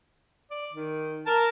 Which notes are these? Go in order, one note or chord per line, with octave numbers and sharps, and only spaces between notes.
D5
D#3
A#4 A5